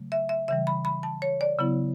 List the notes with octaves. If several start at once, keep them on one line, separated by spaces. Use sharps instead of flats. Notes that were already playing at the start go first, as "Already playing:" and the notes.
Already playing: C#3 F#3 A3
E5
E5
C#3 E3 G3 E5
B5
B5
A5
C#5
D5
C#3 F#3 B3 E4